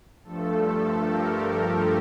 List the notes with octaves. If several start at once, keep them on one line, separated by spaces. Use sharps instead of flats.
G2 F3 A3 A4
G4 A#4